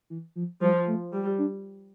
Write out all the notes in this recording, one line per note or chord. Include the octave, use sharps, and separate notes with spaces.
E3
F3
F3 G3
A3
G3
D4